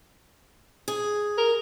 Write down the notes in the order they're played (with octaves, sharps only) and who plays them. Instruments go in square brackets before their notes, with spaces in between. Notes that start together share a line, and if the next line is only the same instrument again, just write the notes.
[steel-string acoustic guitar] G#4
[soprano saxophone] A#4